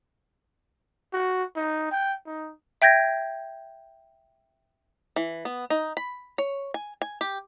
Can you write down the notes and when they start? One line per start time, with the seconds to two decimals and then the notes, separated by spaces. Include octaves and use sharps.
1.13 F#4
1.56 D#4
1.91 G5
2.27 D#4
2.82 E5 G5 G6 G#6 A#6
5.16 E3
5.45 B3
5.70 D#4
5.97 B5
6.38 C#5
6.74 G#5
7.02 G#5
7.21 G4